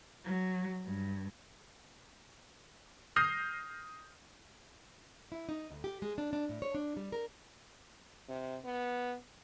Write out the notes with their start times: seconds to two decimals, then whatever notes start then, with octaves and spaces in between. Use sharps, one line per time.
0.24 F#3
0.85 G2
3.16 D#6 F6 G6 A#6 C7
5.32 E4
5.49 D#4
5.70 D2
5.84 G4
6.02 G#3
6.18 D4
6.33 D4
6.49 A2
6.62 C#5
6.75 D4
6.97 G3
7.12 A#4
8.29 C3
8.64 B3